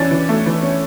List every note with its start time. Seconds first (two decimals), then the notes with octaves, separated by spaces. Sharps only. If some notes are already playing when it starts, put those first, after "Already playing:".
Already playing: E3 C#4 D4 A6
0.11 E3
0.29 A3
0.46 E3
0.63 C#4